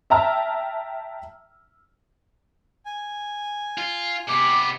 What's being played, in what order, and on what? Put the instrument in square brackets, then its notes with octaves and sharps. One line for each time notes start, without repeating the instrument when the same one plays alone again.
[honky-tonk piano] E5 G5 A5 A#5 E6 F6
[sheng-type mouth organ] G#5
[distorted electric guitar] F4
[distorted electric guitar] C3 B3 [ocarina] D6